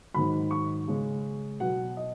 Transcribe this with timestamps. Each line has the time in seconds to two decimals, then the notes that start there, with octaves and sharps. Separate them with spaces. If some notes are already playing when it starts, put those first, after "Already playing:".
0.14 G#2 D#3 F#3 B5
0.51 C#6
0.87 C#3 G#3 C#4
1.60 B2 F#3 B3 F#5
1.97 D#5